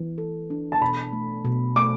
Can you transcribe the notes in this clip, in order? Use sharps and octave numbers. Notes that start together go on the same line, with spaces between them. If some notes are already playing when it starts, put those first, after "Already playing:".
Already playing: E3
A4
D4
A5
B2 B5
A3
B2
A3 D6